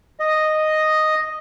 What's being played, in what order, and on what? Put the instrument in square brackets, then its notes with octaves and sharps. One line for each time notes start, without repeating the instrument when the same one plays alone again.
[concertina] D#5